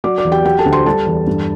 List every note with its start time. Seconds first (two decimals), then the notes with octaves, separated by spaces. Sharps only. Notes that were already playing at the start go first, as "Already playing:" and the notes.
0.04 F#3 D5 D6
0.18 D5 D6
0.25 E2
0.31 G4 G5
0.45 F#3 G4 G5
0.59 A4 A5
0.66 D2
0.73 C5 C6
0.86 G3 A4 A5
1.06 E2
1.27 G2